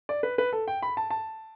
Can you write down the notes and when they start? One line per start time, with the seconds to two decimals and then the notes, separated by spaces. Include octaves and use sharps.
0.09 D5
0.23 B4
0.38 B4
0.53 A4
0.68 G5
0.82 B5
0.97 A5
1.10 A5